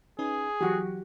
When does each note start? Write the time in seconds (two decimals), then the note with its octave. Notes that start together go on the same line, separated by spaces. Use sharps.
0.19 C#4 D#4 G#4 B4
0.61 E3 F#3 F#4 G4